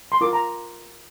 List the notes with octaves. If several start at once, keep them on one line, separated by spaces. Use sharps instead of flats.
C6
F4 A#4 D6
A#5